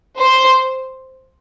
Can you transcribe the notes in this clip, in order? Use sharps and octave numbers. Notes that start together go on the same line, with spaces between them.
C5